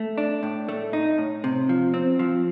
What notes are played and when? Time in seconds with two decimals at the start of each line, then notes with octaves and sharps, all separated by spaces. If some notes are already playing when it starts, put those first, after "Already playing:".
Already playing: A3
0.18 D4
0.43 A2
0.69 A3
0.93 D#4
1.18 A2
1.44 C3
1.69 F3
1.94 C4
2.19 F3